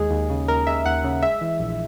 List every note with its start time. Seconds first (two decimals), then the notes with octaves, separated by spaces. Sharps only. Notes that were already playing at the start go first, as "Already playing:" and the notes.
Already playing: D#2 G#3 G#4
0.11 D#2
0.30 C#3
0.48 D#2 A#4
0.67 G#3 E5
0.85 D#2 F#5
1.04 C#3
1.22 G#3 E5
1.41 E3
1.60 A#1